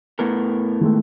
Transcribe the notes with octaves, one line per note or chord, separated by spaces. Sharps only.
A2 B3 A#4
D#3 G#3 A3